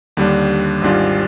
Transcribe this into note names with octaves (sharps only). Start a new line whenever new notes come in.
D#2 D3 G3 D4
G#1 G#2 G3 D4 F4